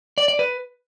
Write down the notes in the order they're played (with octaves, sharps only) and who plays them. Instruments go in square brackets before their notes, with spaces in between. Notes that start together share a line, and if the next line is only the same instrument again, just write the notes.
[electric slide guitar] D5
D5
B4